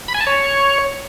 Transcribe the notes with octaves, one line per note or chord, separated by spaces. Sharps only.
B5
G#5
A5
C#5